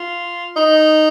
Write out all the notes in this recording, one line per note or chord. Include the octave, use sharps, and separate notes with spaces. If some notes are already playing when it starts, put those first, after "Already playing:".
Already playing: F4
D#4